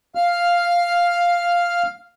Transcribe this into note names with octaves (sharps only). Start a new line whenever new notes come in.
F5 F6